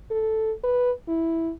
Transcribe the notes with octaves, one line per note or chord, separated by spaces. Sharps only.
A4
B4
E4